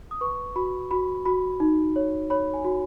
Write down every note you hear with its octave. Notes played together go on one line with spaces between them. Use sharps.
D#6
B4 C#6
F#4 B5
F#4 B5
F#4 B5
D#4
C#5
C#5 B5
G#5
F#4